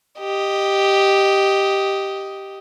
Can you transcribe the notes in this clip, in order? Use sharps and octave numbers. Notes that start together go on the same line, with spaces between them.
G4 D#5